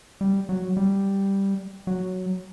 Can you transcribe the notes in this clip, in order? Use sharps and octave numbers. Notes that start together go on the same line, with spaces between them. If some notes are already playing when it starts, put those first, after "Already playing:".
G3
F#3
G3
F#3